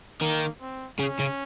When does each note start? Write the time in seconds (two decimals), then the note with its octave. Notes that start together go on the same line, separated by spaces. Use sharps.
0.21 D#3 A#3
0.61 C4
0.99 C#3 C#4
1.19 C#3